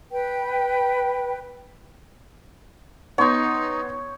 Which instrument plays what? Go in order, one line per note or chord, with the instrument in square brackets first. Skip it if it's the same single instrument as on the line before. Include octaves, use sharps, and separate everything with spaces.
[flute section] B4 G5
[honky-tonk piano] B3 C6 [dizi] D#4 [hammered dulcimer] C#5 G5